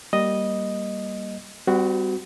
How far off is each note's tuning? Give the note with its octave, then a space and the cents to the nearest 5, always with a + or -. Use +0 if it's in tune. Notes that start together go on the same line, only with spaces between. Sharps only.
G3 -10 A#3 +0 D#5 +0
G3 +0 C4 -40 F#4 +0